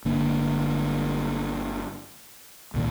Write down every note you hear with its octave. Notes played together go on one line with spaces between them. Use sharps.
G1 D3 A#3 D4
C2 A#2 D#3